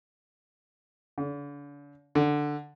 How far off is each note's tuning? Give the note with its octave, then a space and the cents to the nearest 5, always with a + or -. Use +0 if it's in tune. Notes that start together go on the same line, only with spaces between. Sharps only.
D3 -40
D3 +5